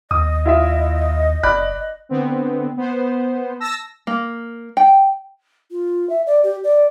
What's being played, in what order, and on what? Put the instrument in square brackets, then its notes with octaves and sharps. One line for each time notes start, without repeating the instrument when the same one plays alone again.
[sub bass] D#2 [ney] D#5 [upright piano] D#6
[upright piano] E4 F4 E5
[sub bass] F#1 [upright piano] D5 B5 F#6
[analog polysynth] D3 B3 C4
B3 C5
A5 E6 A#6
[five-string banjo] A#3
G5
[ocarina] F4
E5
D5
G4
D5